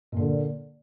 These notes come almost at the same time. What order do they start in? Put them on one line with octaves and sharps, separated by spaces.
A#2 D3 A#3